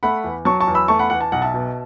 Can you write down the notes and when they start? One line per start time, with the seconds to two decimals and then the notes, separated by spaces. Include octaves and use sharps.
0.03 A3 F#5 B5
0.24 E2
0.45 F#3 A5 C#6
0.60 A5 C#6
0.67 E2
0.75 B5 E6
0.88 A3 A5 C#6
0.99 F#5 B5
1.10 E2 F#5
1.21 A5
1.32 B1 F#5
1.42 E5 A5
1.54 B2